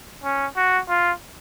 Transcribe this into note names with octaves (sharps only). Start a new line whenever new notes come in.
C#4
F#4
F4